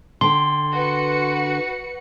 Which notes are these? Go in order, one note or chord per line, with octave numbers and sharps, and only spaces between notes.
D3 G5 C6
F#4 B4 C#7